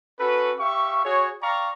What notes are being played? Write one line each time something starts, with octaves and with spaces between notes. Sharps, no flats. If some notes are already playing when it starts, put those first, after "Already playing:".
C#4 F#4 A4 B4
G4 E5 F5 C#6
F#4 G#4 C#5
D5 F5 G5 A#5 C#6